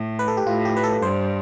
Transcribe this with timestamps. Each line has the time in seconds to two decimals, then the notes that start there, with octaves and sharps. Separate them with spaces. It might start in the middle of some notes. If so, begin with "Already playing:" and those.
Already playing: A2
0.19 B4
0.28 A4
0.37 G4
0.46 A2 F4
0.65 G4
0.77 B4
0.84 A4
1.02 G2 C5